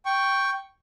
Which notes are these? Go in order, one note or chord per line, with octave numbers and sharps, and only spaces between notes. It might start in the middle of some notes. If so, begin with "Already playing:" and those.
G5 C#6